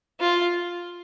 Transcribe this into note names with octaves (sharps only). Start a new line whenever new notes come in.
F4